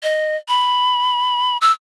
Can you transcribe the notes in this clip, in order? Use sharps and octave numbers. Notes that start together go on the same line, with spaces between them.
D#5
B5
E6